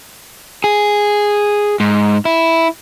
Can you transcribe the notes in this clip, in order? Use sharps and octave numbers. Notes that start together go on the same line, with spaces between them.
G#4
G#2
E4